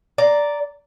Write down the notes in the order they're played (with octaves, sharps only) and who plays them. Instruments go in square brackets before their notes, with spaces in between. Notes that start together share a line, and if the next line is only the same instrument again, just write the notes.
[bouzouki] D5 A#5